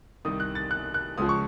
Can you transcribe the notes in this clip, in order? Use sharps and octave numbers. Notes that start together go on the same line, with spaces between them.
C2 C3 D#3 D#6
F#6
A6
F#6
F#6
C#2 C#3 F3 D#6
C#6